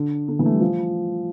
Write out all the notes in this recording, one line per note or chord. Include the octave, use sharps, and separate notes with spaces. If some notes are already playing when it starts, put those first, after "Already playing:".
Already playing: D3
D3
E3
A3
G3
F3